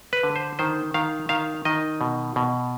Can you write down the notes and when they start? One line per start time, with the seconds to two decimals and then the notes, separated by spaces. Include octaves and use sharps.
0.13 B4
0.23 D3
0.36 C5
0.59 D#3 C5
0.94 D#3 F5
1.29 D#3 F5
1.65 D#3 D#5
2.01 B2
2.36 B2